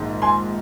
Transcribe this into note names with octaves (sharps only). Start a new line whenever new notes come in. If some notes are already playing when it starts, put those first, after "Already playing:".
Already playing: A#1 G#2 D#3
G#5 C6